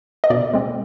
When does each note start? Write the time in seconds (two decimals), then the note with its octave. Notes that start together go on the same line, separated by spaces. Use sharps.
0.24 D#5
0.30 B2 D5
0.53 G#3 C4